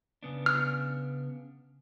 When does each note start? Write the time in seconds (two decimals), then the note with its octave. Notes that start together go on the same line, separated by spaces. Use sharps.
0.23 C#3 B3 D4
0.46 F6